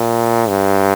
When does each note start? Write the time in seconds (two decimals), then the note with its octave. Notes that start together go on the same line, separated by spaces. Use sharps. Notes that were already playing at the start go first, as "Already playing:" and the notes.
Already playing: A#2
0.48 G2